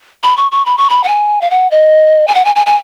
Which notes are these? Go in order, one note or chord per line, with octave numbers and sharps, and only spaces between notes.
B5
C#6
C#6
B5
C#6
B5
F#5
G#5
F5
F#5
D#5
G#5
F#5
G#5
G#5
G#5